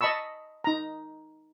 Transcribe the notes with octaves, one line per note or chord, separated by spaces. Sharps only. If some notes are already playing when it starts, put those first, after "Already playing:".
D#5 A5 B5 C#6 E6
D#4 A#5